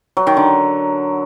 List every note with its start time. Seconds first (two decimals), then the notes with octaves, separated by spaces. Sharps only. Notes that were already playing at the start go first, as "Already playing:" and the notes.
0.17 F#3
0.27 D#3
0.37 D3